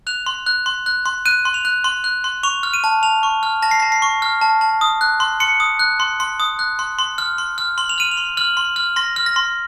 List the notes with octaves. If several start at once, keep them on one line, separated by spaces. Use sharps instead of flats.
F#6 F7
C6
F#6
C6
F#6
C6
F#6 D#7
C6
F7
F#6
C6
F#6
C6
C#6 F7
F6
D#7
A5
A5 F7
C#6
F6
A5 A#6
C7
A5 A#6
C7
C#6
F6
A5
A5
D#6
F#6
C6
C6 C#7
D#6
F#6
C6
C6
D#6
F#6
C6
C6
F6
C6
F6
C6 F#7
F7
F6 D#7
F7
C6
F6 F#7
C6
F6
C6 A#6
F6
A#6
C6